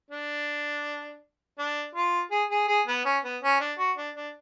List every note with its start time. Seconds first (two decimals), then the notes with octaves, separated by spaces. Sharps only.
0.11 D4
1.58 D4
1.95 F4
2.31 G#4
2.51 G#4
2.68 G#4
2.87 B3
3.05 C#4
3.24 B3
3.43 C#4
3.60 D4
3.79 F#4
3.97 D4
4.16 D4